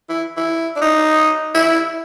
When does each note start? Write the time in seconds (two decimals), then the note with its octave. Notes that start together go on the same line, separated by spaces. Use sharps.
0.09 E4
0.37 E4
0.76 D4
0.82 D#4
1.55 E4